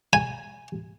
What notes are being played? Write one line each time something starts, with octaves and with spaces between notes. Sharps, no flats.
G#5